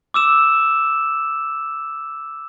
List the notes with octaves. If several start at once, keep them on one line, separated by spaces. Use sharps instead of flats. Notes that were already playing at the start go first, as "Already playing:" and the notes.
D6 E6 E7